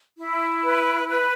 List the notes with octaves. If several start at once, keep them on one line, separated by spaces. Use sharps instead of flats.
E4
B4
B4